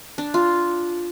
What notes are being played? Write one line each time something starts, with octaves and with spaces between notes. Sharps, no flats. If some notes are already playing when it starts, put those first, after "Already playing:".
D4
F4